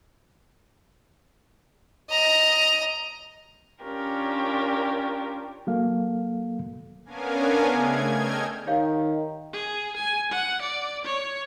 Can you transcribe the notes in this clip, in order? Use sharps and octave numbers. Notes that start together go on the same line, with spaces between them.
D#5 A#5
C#4 D4 F4 G4 A#4
F#3 A#3 A4 F5
B3 C#4 D4 A#4 F5 G#5
C#3 A3 G#4 G#6
A4 D#5 G5 F6 G#6
D#3 G4 C#5 F5
G#4
G#5
F#5
D5
C#5